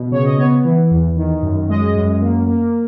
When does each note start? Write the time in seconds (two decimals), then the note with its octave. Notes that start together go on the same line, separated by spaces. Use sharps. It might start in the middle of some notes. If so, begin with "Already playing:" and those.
Already playing: B2
0.12 C#3 C#5
0.25 D#5
0.38 B3 C#5
0.65 E3
0.91 E2
1.17 D#3
1.42 F#2
1.69 G#3 D#5
1.95 F#2
2.22 A#3
2.47 A#3